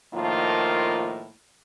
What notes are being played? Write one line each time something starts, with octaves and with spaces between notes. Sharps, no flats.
A2 D#3 F3 A#3 F4